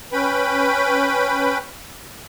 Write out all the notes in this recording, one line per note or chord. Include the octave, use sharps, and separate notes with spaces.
C#4 B4 G5 B5